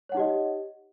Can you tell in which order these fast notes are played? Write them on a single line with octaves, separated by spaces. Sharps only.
C#5 F#5 D#4 G4 D#5